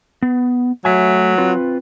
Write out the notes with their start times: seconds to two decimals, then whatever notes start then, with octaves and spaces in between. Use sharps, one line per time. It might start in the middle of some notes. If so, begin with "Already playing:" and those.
0.22 B3
0.85 F#3 A3 E5 G#5
1.38 C4 F4 B4